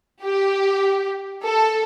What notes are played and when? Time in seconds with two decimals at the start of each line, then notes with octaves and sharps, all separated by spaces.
0.24 G4
1.44 A4